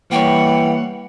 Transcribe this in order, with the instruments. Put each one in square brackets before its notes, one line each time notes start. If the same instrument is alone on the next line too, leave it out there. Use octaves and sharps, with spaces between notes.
[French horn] E3 [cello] G3 F#5 [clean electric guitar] A#3 C#5 [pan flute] G5